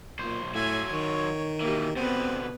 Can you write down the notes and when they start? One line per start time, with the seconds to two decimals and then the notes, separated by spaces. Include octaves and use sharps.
0.19 B1 A#2 C5
0.54 A2 F#3 F4 E5 G#5
0.91 D#3 C#5
1.61 B2 E3 A#3 G4
1.97 B2 D3 B3 C4 B4